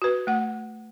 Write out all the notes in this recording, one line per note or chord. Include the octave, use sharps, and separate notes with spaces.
F#4 B4
A3 F#5